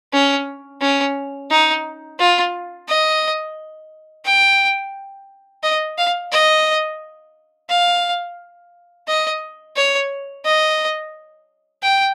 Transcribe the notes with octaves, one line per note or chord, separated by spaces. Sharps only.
C#4
C#4
D#4
F4
D#5
G5
D#5
F5
D#5
F5
D#5
C#5
D#5
G5